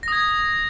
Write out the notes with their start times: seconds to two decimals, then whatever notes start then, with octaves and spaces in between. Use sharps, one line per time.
0.03 A#6
0.08 D#6
0.12 G#6